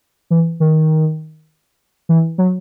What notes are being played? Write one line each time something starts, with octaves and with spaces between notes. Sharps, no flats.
E3
D#3
E3
F#3